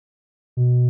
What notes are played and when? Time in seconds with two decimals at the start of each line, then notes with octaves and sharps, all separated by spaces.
0.57 B2